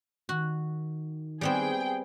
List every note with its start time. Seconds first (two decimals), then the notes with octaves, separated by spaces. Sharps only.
0.29 D#3 F#4
1.41 G3 B3 C4 G#4 G5